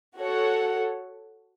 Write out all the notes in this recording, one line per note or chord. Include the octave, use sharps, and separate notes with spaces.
F#4 A4 C#5 F#5